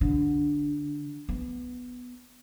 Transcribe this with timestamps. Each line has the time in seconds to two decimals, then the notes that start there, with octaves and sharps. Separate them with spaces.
0.01 D3
1.29 B3